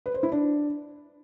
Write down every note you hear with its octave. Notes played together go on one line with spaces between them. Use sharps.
B4
C5
E4
D4